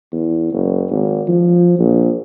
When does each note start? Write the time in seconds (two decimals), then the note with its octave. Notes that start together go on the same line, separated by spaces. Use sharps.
0.12 E2
0.52 F#1
0.90 G#1
1.28 F3
1.79 A#1